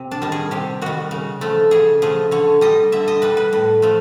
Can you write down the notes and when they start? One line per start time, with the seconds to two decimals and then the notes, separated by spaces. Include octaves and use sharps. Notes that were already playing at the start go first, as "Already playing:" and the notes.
Already playing: C3
0.11 D4
0.22 D#3 G3
0.32 G#4
0.51 C3 G4
0.82 D#3 G3 F#4
1.11 C#3
1.41 F3 A3
1.71 C#3 G#4
2.02 F3 A3 G#4
2.31 D3 C#5
2.61 G3 D#5
2.92 D3 E5
3.08 D#5
3.22 G3 B4
3.37 B4
3.53 A2
3.82 F3 A3